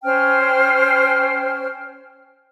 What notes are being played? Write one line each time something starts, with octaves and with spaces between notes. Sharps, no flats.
C#4 C5 G5 F6